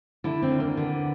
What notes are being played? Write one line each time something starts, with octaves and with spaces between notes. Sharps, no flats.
D3 E4
C4
D#2
A#3
D3 B3